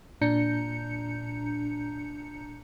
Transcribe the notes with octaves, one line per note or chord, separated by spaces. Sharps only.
A#2 D4 A#5 G6 C#7